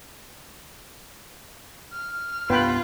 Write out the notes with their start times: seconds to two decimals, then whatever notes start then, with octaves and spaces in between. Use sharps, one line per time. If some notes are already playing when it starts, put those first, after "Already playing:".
1.93 F6
2.50 C2 G2 B3 F4 B4 G5 B5